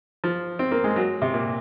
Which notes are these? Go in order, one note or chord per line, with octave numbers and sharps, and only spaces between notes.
F3
C4
A#3
G#3
F#3
C3
A#2